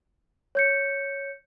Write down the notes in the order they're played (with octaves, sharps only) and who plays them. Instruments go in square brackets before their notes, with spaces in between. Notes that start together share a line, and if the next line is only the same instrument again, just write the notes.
[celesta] C#5 G6 C#7